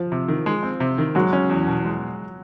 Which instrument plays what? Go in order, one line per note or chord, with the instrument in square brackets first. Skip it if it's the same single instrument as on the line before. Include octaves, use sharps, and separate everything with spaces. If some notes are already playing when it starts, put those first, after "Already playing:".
Already playing: [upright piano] F3
[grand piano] C3
D#3
G#3
C4
C3
D#3
[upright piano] F#3 [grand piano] G#3
[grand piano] C#4
E2
B2
G#3